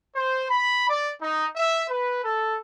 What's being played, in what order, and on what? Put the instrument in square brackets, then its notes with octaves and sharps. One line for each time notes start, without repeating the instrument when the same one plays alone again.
[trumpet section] C5
B5
D5
D#4
E5
B4
A4